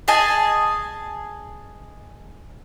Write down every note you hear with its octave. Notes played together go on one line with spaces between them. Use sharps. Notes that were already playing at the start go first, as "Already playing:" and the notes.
G#4 D#5 G#5 A5